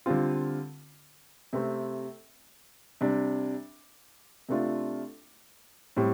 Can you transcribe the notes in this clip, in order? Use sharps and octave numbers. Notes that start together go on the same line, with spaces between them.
D3 G3 C4 F4
C3 A3 C4
C3 G3 D4
C3 A3 D4 F4
A2 G3 C4